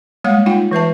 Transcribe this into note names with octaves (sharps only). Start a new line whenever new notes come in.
G3 G#3 A#3 C#5 F5 F#5
D#4 F4 F#5 G5
E3 B4 E5 A5